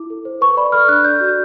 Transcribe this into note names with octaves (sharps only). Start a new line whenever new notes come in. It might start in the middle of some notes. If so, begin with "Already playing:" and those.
Already playing: E4 D6
A4
C5
B4 C#6
D5 B5
A4 F6
D4 F#6
D5 G6
F#4